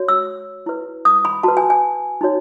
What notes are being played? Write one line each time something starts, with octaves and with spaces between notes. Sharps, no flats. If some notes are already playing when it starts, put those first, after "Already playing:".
Already playing: F#4 C#5
E6
E4 B4
D#6
B5
F#4 B4 A5
G#5
G#5
D#4 F#4 C#5